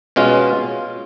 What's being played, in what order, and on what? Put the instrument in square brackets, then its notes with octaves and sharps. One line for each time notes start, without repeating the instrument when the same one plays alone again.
[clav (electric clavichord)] B2 G#3 C#4 F4